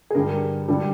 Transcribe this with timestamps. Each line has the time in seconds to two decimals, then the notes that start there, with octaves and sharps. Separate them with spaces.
0.10 G#4
0.15 G2 D3 G3 A#4
0.68 D3 G3